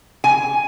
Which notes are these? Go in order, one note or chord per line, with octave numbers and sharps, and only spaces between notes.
G#5